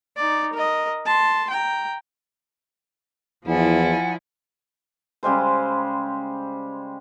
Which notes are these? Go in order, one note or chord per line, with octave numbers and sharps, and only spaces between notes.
D#4 D5
A#4 D#5
A5 C6
G5 A#5
E2 F3 E4 D5 F#5 G#5
C#3 G3 G#3 C5